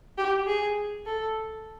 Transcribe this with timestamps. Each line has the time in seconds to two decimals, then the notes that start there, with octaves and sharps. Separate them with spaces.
0.18 G4
0.46 G#4
1.06 A4